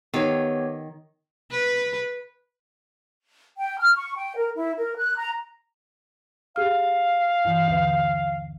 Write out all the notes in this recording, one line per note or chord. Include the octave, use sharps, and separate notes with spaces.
D#3 B3 G4 C#5
B4
G5
F6
C#6
G5
A#4
E4
A#4
F#6
A#5
G4 G#4 F5 F6
G2 E3
D#2 D3